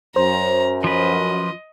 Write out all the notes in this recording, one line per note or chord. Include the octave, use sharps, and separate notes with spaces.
F#2 C5 A#5
F3 B4 D#5